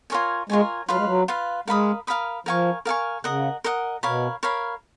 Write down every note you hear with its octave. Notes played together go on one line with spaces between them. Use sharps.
F4 A#4 C#5 G#5
G#3 F4 A#4 C#5 G#5
F#3 F4 B4 F5
G#3
F#3
F4 B4 F5
G#3 A#4 F5 B5 D#6
A#4 F5 B5 D#6
F3 A#4 F5 G#5 C#6
A#4 F5 G#5 C#6
C#3 A#4 D#5 F#5
A#4 D#5 F#5
B2 A#4 C#5 F5 B5
A#4 C#5 F5 B5